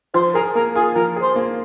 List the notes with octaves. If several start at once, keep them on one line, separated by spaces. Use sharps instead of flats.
F3 C5
G#4 A#4
A#3 A#4
F4 G#4
F3 A#4
G#4
C5
A#3